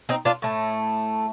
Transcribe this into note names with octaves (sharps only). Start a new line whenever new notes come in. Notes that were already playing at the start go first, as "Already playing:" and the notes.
C4 D#4
D4 F4
A2 A3